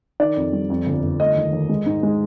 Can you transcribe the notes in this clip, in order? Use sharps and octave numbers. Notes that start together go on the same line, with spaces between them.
D#3 D5
F2
G3
F2
G1
G1
A3 D#5
D#2
D#2
G#3
G#2
G#3